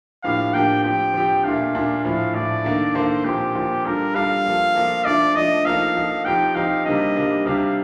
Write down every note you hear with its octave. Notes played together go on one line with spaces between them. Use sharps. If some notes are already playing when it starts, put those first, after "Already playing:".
A2 F3 A#3 D4 G4 F5
A2 F3 A#3 D4 G4 G5
F3 C4 G4 G5
F3 C4 G4
A#2 A3 D4 F5
A#2 A3 D4
A2 F3 A3 F5
A2 F3 A3 D5
D#3 A#3 D4 A4
D#3 A#3 D4 A4 C5
A#2 F3 C4 G4
A#2 F3 C4
G3 D4 F4 A4 A#4
G3 D4 F4 A4 F5
F3 A#3 F4 A4
F3 A#3 F4 A4
F3 A3 D4 D5
F3 A3 D4 D#5
F3 A#3 D#4 A4 F5
F3 A#3 D#4 A4
F3 C4 D#4 G4 G5
F3 C4 D#4 G4 F5
C3 G3 A#3 D4 D#5
C3 G3 A#3 D4
C3 G3 D4 G4 F5